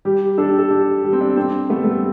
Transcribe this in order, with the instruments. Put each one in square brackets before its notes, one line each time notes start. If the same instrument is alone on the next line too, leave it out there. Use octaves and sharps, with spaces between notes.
[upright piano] G3 [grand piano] G4
[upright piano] D4 [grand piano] A4
[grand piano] G4
A4
[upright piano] D4 [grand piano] G4
[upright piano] G3
[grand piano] C4
D4
[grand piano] C4 [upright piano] D4
[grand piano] A3 [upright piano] B3
[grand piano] G3
A3